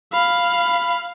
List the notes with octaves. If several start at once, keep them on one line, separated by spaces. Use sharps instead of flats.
F5 B5